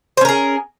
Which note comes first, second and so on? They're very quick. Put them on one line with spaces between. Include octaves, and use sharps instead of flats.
C5 C#4 A#4 G#4